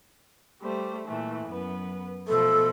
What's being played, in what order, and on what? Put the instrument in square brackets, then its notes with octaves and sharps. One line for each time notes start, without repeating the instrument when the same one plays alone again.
[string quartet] G3 A3 C5
A#2 E3 A3
F#2 B3 B4
[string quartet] B2 F3 A3 [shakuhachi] A4